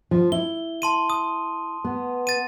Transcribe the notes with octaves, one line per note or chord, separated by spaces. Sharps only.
F3
E4 G7
A5 C6 D#7
D#6
B3
A6 D#7